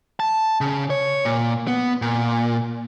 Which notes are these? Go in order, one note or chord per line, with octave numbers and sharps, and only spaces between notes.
A5
C#3
C#5
A#2
B3
A#2